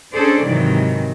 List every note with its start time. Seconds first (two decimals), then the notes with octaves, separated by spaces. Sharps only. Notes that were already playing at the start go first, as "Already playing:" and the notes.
0.13 C#4 D4 G#4 A4 C5 D5
0.46 G#2 C3 D#3 E3 F#3